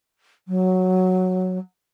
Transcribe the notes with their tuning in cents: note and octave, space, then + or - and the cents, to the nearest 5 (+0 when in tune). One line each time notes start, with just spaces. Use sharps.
F#3 -5